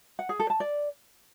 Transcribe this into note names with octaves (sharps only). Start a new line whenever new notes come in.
F#5
G#4
A4
A5
D5